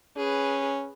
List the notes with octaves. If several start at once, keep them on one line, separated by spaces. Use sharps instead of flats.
C#4 G#4 B4